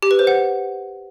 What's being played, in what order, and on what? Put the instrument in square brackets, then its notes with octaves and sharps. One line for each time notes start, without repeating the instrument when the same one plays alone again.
[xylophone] G4
B4
C5
F#5